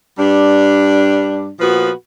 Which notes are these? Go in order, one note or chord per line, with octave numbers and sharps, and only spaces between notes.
G2 G3 D4
A#2 F3 B3 F#4 B4